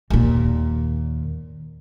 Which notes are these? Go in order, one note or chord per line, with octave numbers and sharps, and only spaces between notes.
D#2 A#2